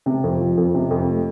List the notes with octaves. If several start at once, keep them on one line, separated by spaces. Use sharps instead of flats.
C3
F2
F3
F2
C3
F2
A3